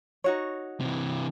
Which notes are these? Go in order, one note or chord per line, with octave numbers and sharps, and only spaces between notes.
D#4 F#4 C#5
C3 E3